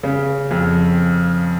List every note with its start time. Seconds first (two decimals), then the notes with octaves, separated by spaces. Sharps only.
0.03 C#3
0.51 F2